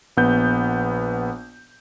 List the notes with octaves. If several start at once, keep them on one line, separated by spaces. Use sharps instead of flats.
A#1 B3 G6